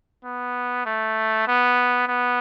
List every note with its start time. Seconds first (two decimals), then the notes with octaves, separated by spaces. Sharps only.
0.24 B3
0.85 A3
1.47 B3
2.08 B3